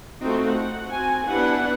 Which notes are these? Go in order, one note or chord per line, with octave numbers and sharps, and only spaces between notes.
A3 C4 D#4 F4 F#4
F#5
C4 F#4 G#5
B3 D4 E4 G4 B4 F#5